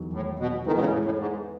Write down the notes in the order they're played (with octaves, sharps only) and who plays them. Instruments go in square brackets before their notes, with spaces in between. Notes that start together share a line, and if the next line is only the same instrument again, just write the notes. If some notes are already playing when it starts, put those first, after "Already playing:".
Already playing: [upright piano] E2 D#3 F#3
[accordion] A2
B2
[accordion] D#3 [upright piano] E3 G#3 B3 E4 A4
[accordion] B2
C#3
A2
A2
G#2